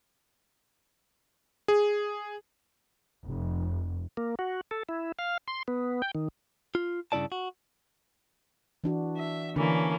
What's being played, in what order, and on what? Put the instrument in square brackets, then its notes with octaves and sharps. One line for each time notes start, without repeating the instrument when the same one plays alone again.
[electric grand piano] G#4
[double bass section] F1
[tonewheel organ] A#3
F#4
A4
E4
F5
C6
B3
G5
D#3
[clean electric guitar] F4
G2 C#3 C4 E4 D5 A5
F#4
[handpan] E3 D4 F#4
[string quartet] E5
[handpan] D3 D4 [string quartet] E3 A#3 C#4